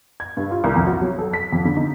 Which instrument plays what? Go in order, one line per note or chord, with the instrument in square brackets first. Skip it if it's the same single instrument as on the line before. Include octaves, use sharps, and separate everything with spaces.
[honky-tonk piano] G#6
G2
F4
C2
F2
F#4
F#3
A4
B6
F2
D3
D#4